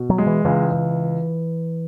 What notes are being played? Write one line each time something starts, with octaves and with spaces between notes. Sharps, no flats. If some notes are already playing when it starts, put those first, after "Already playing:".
Already playing: B2
F#3
G#3
E3
C#2 E3
C#2